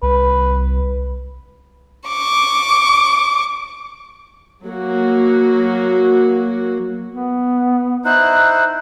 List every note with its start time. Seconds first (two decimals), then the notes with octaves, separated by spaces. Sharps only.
0.03 C2 B4
2.08 C#6 D6
4.64 F#3 A#3 F#4
7.12 B3
8.05 D#4 E4 C5 F#6